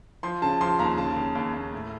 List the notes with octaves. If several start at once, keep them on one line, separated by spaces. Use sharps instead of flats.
F3 C6
C#3 A5
F3 C6
D#2 A#5
C#3 A5
C#3
D#2
D#2
A2